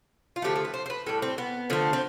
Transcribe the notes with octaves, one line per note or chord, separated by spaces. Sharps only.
F4
D3 F3 A3 G4
A4
B4
C5
C5
B4
A2 G3 A4
C4
B3
D3 F3 A3
C4